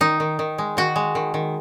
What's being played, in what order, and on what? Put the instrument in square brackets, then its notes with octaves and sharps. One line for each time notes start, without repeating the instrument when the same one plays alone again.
[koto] D#3 D#4
D#3
D#3
G#3
D#3 F#4
G#3
D#3
D#3